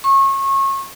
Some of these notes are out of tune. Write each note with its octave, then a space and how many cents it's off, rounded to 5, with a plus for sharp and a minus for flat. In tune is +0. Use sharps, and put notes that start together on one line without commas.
C#6 -30